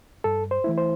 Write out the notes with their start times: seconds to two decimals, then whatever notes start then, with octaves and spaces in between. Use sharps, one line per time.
0.24 G2 A4
0.51 C5
0.64 E3 A3 E4
0.78 C5